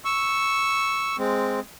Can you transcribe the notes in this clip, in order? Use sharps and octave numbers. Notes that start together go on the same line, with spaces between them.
C#6 E6
G#3 C4